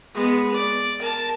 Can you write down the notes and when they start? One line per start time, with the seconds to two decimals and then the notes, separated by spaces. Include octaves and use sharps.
0.14 G#3 B3
0.55 D5
1.00 A#4 A5